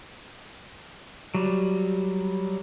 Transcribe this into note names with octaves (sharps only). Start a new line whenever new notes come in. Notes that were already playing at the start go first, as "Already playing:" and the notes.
F#3 G3